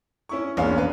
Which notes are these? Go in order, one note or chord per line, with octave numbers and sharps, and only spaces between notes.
C#4 E4 C#6
A#1 E2 C#4 F5
B4